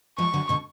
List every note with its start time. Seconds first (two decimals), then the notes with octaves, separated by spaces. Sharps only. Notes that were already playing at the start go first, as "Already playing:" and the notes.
0.18 F3 G#3 C#6
0.34 D3 F#3
0.49 B2 D3